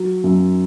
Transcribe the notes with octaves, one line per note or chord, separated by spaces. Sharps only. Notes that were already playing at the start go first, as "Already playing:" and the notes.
Already playing: F#3
F#2